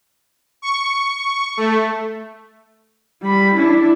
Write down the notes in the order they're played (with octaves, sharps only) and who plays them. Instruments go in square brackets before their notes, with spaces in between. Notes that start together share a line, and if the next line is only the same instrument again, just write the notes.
[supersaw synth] C#6
A3
[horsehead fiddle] G3 B5
D4 E4